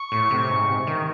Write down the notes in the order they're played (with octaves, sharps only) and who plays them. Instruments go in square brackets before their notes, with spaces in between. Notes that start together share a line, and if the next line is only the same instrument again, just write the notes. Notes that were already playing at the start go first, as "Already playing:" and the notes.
Already playing: [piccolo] C#6
[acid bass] A2
C3
G#2
C3
D#3